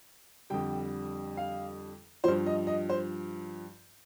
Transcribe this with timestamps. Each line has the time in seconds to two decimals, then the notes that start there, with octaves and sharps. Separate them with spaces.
0.50 F2 D3 G3 G5
1.37 F5
2.24 G2 F3 C5
2.46 D#5
2.67 D#5
2.89 C5